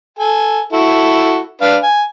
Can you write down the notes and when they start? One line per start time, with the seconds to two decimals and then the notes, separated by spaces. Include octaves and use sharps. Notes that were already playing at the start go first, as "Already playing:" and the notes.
0.19 A4 G#5
0.73 E4 F#4 A4
1.61 D4 B4 F5
1.83 G#5